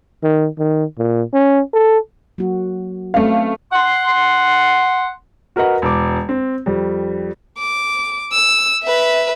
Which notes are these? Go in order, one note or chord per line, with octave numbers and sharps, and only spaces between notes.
D#3
D#3
A#2
C#4
A4
F#3 A#3 F#4
A3 C4 C#4 B4 F5
F#5 C6
F#4 A#4 B4 D#5 F#5
E1 D6
C4
F2 G3
D6
E6
B4 E5